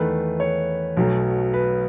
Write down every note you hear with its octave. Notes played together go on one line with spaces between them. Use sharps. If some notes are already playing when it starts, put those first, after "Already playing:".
Already playing: E2 D#3 A3 B4
C#5
B1 B2 F#3 A3
B4